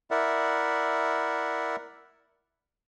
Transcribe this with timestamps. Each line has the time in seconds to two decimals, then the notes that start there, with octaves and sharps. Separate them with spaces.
0.11 E4 A#4 D5 E5 F#5